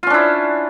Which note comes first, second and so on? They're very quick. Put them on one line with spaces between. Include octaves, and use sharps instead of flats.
F4 C#4 D4 E4